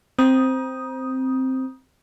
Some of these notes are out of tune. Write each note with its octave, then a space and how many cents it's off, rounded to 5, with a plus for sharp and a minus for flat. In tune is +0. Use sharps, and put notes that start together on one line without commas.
C4 +0 A#5 +35 D#6 +0